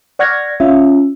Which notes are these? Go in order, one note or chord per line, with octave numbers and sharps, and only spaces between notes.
D5 F#5 C#6 F6 G#6 A#6
C#4 F4 E5